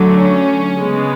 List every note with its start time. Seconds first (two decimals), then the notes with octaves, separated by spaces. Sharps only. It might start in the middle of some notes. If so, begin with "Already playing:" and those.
Already playing: D3 F#3 A3
0.18 C#4
0.76 C#3 G#3 B3